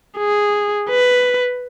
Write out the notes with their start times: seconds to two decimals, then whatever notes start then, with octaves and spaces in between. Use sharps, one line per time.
0.18 G#4
0.90 B4